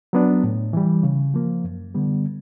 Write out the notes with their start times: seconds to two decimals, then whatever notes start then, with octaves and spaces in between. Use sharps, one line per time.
0.13 F#3 B3 D4
0.44 A2
0.73 E3 G3
1.03 C#3
1.34 F3 A#3
1.64 F#2
1.94 D3 G3 B3